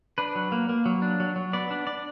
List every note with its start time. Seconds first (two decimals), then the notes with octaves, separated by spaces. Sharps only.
0.18 D4 B4
0.35 F#3
0.52 A#3
0.69 A#3
0.86 F#3
1.02 D4
1.20 F#3
1.36 F#3
1.53 B3 D5
1.71 D4
1.87 D4 D5